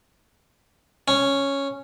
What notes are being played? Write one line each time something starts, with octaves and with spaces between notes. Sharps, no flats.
C#4